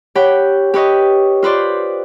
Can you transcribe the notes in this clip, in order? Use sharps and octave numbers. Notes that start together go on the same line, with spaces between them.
G4 C#5 F#5 G5 B5
G4 B4 C#5 D#5
F4 B4 C5 D5